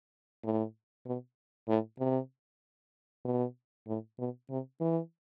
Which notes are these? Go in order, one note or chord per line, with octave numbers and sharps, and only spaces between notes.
A2
B2
A2
C3
B2
A2
B2
C3
E3